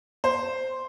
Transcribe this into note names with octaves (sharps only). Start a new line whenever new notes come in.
C5